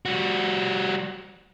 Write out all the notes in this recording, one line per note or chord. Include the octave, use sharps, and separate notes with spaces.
G3 F#4